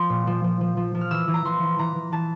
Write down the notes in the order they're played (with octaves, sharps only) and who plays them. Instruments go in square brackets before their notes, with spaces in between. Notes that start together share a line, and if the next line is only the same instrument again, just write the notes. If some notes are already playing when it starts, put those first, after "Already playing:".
Already playing: [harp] F3 C6
A#2
F3
F3
F3
F3
F3
F6
E3 E6
E3
A#5
E3 C6
E3
E3 A#5
E3
E3 A5